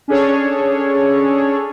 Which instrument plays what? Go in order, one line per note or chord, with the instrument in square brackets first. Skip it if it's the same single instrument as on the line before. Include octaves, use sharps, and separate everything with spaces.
[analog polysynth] C#4 D4 G#4 A4 C#5